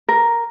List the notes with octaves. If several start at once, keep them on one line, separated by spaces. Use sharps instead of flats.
A#4